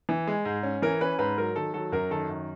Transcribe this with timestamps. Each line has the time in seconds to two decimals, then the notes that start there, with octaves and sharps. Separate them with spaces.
0.09 E3
0.27 G#3
0.45 G#2
0.63 C#4
0.82 E3 A#4
1.01 C#4 B4
1.19 G#2 B4
1.38 F#3 A#4
1.56 D#3 A4
1.74 F#3 A4
1.92 F#2 A#4
2.10 D#3 A4
2.29 F#2